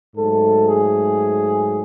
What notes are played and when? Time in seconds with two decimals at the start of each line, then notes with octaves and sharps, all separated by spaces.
0.16 G#2 F#3 A3 A4
0.68 G#4